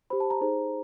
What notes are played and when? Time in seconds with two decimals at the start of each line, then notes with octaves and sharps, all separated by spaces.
0.10 G4 C5 B5
0.20 A5
0.30 A#5
0.41 D#4 G#4 C5